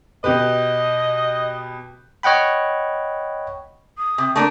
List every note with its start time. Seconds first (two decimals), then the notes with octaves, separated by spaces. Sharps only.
0.24 B2 G4 B4 D#5
2.23 C#5 D#5 F#5 G5 B5
3.98 D#6
4.18 C3
4.36 A3 A#3 D4